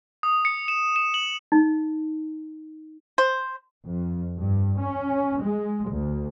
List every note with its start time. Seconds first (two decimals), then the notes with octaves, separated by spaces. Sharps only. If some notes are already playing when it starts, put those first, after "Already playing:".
0.23 D#6
0.45 C#7
0.68 E7
0.96 E7
1.14 F#7
1.52 D#4
3.18 C5
3.85 F2
4.39 G2
4.78 C#4
5.41 G#3
5.90 D2